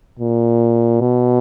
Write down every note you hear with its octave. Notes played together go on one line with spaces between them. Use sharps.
A#2
B2